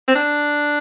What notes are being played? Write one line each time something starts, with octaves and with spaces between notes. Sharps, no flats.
C4
D4